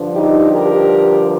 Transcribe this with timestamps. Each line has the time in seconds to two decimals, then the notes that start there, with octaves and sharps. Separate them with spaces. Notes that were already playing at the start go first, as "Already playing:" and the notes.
Already playing: G2 D3 F3
0.12 D#4 G4
0.52 G4 A#4